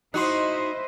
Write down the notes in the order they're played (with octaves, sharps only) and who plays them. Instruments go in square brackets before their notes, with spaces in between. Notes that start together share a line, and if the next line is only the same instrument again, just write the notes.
[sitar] D#4 F#4 [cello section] E4 C5 D#5 [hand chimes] C6 F#6